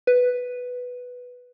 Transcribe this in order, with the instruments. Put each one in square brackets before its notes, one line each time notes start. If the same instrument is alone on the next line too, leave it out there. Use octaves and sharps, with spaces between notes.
[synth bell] B4